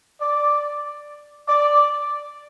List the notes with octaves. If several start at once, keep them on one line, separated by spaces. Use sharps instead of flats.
D5
D5